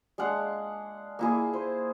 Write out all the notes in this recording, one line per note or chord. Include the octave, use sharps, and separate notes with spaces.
G#3 D4 F5 F#5
A#3 E4 G#4
C5